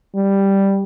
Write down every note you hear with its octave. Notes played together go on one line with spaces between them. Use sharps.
G3